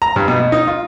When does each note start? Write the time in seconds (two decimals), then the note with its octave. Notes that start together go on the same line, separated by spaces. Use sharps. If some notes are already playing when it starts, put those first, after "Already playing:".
0.02 A#5
0.16 G2
0.28 B2
0.40 B2
0.52 D#4
0.67 F4